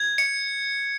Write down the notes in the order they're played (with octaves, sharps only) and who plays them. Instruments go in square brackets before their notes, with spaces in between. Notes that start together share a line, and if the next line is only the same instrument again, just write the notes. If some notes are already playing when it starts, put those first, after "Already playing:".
Already playing: [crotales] G#6
C#7